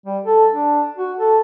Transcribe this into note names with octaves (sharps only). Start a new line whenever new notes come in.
G3
A4
D4
F#4
A4